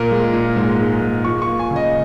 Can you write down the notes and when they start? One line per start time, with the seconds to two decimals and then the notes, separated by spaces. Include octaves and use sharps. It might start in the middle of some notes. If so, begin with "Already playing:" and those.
Already playing: A#2 A#4
0.11 G#3
0.33 A#2
0.56 G#2
0.80 G#3
1.02 G#2
1.25 F4 C#6
1.42 C#6
1.48 A#3
1.59 G#5
1.71 C#3
1.76 D#5